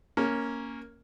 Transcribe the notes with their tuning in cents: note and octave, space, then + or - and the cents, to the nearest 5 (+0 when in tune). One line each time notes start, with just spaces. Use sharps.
A#3 +0 C#4 +0